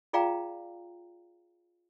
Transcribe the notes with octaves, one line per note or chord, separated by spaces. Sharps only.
F4 G#4 D5 F5 G5 A#5